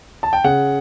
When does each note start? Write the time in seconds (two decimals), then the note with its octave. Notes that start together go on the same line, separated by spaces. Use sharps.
0.23 A5
0.33 G5
0.44 C#3 F#5